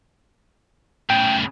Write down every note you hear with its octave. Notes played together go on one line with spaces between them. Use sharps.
A2 C#3 G5